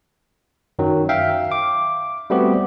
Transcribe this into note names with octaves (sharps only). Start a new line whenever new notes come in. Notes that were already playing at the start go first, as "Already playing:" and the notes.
F#2 D#3 F#3
E5 F5 G5
D6
G3 A3 B3 C4 F#4 G4